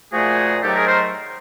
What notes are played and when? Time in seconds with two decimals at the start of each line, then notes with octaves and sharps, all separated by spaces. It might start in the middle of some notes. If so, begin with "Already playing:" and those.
0.12 A#2 F3 A3 F#4 G#4
0.62 G#2 D#3 F#3 A3 G4 A4
0.75 G#4 A#4
0.87 A#4 C5